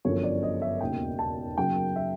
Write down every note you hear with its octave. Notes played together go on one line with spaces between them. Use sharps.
G1 F#2 D3 F3 C#5
D5
D#5
E5
E1 D#2 C#3 G5
A5
F#2 C#3 F#3 A#3 G5
E5